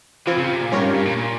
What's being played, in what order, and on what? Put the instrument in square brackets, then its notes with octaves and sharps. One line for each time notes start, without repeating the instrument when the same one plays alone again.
[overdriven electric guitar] E3 [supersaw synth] F3 C4 F4
[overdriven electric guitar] C#3
C3
A#2
[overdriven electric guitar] G#2 [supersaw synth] G3 C#4 F4 A#4 C#5
[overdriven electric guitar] G2
G2
A#2
A#2